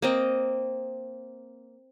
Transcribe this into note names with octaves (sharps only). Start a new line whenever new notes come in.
A#3 C4 D#5